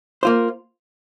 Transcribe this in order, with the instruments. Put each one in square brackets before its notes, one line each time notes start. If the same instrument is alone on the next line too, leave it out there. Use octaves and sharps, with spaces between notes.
[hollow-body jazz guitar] A#3 F4 C5